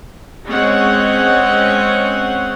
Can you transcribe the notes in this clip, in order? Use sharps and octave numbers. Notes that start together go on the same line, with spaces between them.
G#3 C4 C#4 C#5 F#5